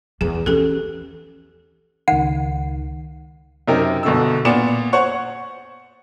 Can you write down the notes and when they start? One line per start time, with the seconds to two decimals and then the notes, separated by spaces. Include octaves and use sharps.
0.21 E2 E3 G#4
0.46 E3 C#4 G4 A4
2.08 C#2 D#3 F#5
3.68 F#2 C3 D#4 A#4 G5
4.03 G1 B2 D3 E6
4.45 A#2 B3 D5 C#7 E7
4.93 C5 C#5 F#5 C#6
5.12 F#5